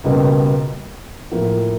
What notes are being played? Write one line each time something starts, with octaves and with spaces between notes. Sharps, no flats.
C#2 B2 G3 A#3
A2 F3 A#3